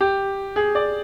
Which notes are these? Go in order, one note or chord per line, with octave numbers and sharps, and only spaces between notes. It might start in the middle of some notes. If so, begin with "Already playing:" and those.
G4
G#4
D5